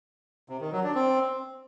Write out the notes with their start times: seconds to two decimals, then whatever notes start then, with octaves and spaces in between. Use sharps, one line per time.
0.49 C3
0.61 D#3
0.72 F#3
0.84 D4
0.95 C4